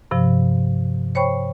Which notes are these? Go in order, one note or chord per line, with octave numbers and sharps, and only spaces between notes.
G2 C3 F3
C5 C#5 G5 B5 C#6